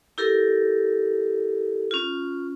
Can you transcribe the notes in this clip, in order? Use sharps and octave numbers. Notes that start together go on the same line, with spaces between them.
E4 G4 A4 A#4
C#4 F4